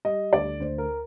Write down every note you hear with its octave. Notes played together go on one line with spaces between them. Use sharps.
G3 D#5
D2 D5
D2 C5
A#4